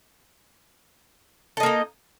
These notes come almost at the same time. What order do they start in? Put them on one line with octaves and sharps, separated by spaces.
A4 D#5 A#3 D#4